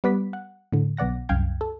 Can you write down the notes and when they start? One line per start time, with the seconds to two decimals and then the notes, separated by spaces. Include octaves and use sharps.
0.04 G3 B3 B4 D5 B6
0.33 F#5
0.72 A2 D3
0.97 B1 B3 D5 F#5 A#6
1.29 C2 F#2 F5 G5 G6 G#6
1.61 A4